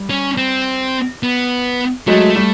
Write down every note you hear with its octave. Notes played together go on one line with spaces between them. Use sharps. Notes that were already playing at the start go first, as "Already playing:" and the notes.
Already playing: G3
C#4
C4
B3
F#3 G#3 A3
G3